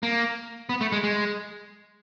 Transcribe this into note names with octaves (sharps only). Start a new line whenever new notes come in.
A#3
B3
A3
G#3
G#3